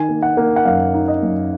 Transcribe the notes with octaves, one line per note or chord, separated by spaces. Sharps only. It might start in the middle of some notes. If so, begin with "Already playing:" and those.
Already playing: D#3 G#5
A#3
F#5
A#3
F#5
F#2 F5
D#4
D#5
F#2